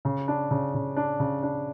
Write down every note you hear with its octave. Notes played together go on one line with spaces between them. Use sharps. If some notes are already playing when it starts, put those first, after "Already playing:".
C#3
D4
C#3
C#3
D4
C#3
D4